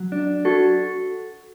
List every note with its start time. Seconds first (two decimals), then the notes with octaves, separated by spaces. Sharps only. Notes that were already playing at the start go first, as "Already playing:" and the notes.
Already playing: F#3
0.12 D4
0.45 F#4 A4